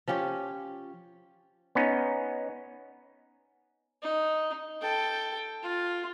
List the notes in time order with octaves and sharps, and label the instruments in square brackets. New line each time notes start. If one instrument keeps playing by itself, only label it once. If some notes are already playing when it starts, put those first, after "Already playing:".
[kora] F3 C#4 G4 C#5
[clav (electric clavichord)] B3 C#4 D#4
[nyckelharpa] D#4
A4 G5
F4